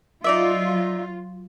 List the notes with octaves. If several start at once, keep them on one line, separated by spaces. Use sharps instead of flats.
F#3 D#4 F4 D5 E5